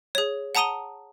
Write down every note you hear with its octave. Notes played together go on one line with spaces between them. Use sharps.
G#4 C#5
F#5 A5 A#5 D#6 D#7 G7